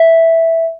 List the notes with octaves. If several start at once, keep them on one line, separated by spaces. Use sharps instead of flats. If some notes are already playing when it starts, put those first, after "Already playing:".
Already playing: E5